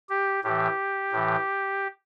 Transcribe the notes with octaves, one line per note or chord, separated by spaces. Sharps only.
G4
A2 E3 G4
A2 E3